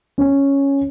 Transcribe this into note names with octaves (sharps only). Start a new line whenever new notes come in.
C#4